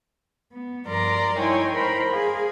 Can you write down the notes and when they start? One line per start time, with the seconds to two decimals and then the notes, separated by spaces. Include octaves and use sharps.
0.52 B3
0.87 G2 F3 A#4 D5 A#5 C6
1.38 D#4 E4 C#5 G5 G#5 C6
1.73 A#4 C5 B5 C6
2.11 G#4 F5